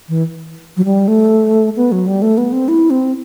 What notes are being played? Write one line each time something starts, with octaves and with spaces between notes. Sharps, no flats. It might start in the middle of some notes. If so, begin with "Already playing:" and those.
E3
F#3
G3
A3
B3
F#3
G3
A3
B3
C4
E4
C4